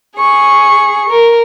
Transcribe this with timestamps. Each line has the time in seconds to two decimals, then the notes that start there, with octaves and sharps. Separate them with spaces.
0.17 G#4 C#6
1.09 A#4